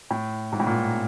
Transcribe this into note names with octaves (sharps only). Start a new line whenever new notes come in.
A2
G#2
A2
A#2